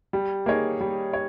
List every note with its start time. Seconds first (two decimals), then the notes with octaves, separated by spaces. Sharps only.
0.13 G3
0.46 A#3 D#4 G#4 C#5
0.81 G3
1.13 C#5